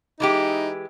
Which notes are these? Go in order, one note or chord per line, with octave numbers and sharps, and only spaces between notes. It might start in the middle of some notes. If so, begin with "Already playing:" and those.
E3 G#3 D#4 G4